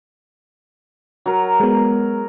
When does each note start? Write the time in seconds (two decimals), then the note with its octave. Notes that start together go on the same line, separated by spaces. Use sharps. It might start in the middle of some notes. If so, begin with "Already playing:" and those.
1.26 F#3 A#4
1.60 G#3 B3